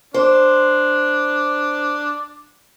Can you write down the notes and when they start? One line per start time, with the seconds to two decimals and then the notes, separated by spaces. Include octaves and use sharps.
0.14 D4 C5